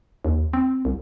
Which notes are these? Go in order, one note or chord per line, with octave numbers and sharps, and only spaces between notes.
D#2
C4
C2